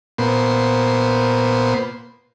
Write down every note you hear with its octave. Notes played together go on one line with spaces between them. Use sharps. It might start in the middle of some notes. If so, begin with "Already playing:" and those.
A#2 B3 C5